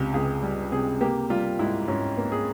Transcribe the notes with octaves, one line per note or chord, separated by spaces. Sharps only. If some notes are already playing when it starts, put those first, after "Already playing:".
Already playing: C#2 C3 G4
C#2 G#4
G3
C3 G#4
A#3 G4
G3 F4
G#2 E4
G#2 C#4
A#3
G#4